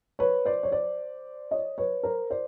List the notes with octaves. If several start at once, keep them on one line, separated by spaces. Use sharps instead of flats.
B4 C#5
C5 D5
C#5
C5 D5
C#5 D#5
B4 C#5
A#4 C5
C5 D5